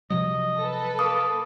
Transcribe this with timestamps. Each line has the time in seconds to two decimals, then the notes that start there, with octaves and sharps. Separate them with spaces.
0.10 C3 F3 F#3 D#5
0.59 A4 B4
0.99 A#3 D#6